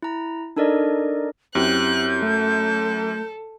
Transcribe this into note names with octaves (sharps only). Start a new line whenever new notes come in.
E4 A#5
D4 D#4 A4 A#4 D5 D#5
F#2 C4 E4 G4 F#6 G6
A3 A4